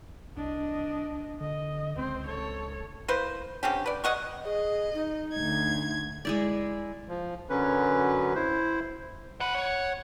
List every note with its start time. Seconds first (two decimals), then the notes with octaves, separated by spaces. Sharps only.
0.37 C2 D4 D#5
1.40 D3 D#5
1.96 C#2 C4 C5
2.27 A4 C#5
3.08 A#3 E4 B4 C5
3.63 D3 C4 C#4 G4
3.86 B4 D5
4.04 G#3 D#5 F#5 C#6
4.45 G#4 D#5
4.94 D#4
5.34 D2 G#6
6.25 G#3 E4 D5
7.08 F3
7.50 F#2 D3 F#3 C#4 B4
8.35 E4 C5
9.40 C5 F#5 B5
9.54 C#5